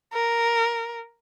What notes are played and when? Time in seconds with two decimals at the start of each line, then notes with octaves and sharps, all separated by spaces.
0.13 A#4